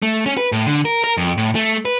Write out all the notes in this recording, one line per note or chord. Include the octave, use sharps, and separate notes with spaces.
A3
C#4
B4
A2
D3
A#4
A#4
F2
A2
A3
B4